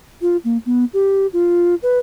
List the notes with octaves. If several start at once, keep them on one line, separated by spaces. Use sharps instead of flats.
F4
A#3
B3
G4
F4
B4